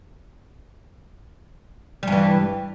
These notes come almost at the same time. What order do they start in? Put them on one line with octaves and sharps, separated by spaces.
G3 G2 E3